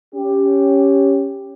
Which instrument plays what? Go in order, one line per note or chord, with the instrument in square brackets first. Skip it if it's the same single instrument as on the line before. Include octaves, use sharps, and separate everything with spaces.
[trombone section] C#4 G4